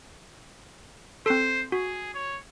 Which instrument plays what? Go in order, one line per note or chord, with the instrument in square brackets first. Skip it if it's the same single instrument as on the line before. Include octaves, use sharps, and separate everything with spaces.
[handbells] C4 A4 [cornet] C5
[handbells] F#4 [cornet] G#4
[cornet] C#5